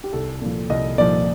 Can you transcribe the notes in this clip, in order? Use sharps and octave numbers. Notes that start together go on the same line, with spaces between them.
G4
C2 A4
A#2 F3
C2 D#5
A#2 F3 D5